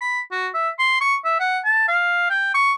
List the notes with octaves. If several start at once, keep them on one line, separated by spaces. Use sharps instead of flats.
B5
F#4
E5
C6
C#6
E5
F#5
A5
F5
G5
C#6